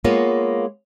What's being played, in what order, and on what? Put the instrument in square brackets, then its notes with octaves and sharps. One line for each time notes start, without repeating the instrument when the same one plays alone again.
[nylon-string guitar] G#3 A#3 B3 F4 C#5